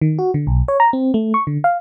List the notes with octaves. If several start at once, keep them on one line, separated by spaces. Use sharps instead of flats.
D#3
F#4
D3
B1
C#5
A#5
C4
A3
C#6
D3
F5